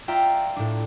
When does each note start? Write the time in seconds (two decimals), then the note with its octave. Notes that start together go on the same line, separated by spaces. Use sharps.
0.08 F4 D5 E5 G5 A#5
0.56 A2 D4